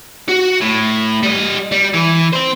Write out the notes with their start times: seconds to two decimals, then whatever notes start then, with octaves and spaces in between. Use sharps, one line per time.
0.28 F#4
0.61 A2
1.23 G3 D#5
1.72 G3
1.93 E3
2.33 C4 C5